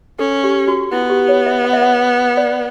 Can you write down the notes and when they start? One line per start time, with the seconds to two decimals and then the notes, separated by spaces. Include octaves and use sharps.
0.19 C#4 A4
0.44 G4
0.68 F#4
0.92 B3 E4
1.10 G4
1.28 C#5
1.46 E5
1.65 F#5
1.73 E5
1.82 F#5
2.37 D5